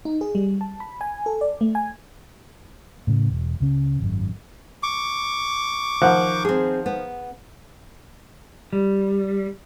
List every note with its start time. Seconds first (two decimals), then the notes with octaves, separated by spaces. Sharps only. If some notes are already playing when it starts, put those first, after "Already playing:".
0.05 D#4
0.21 G#4
0.35 G3
0.61 A5
0.80 B5
1.01 G#5
1.26 A4
1.41 D5
1.61 A3
1.75 G#5
3.07 A2 C#3
3.30 E1
3.60 C#2 C#3 C#4
4.00 G#1 F#2
4.83 C#6 D6
6.01 D#3 F3 F#5
6.45 C4 G#4
6.86 B3
8.73 G3